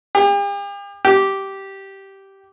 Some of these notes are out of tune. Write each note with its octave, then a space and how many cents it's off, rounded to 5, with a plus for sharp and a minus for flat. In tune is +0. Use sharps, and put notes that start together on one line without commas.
G4 +45
G4 -10